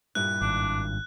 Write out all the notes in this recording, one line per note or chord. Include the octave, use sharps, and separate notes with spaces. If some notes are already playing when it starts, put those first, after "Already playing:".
G2 A#2 E4 F#6
G#1 D4